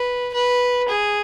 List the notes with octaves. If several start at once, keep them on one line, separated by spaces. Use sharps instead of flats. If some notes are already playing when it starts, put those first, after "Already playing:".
Already playing: B4
B4
G#4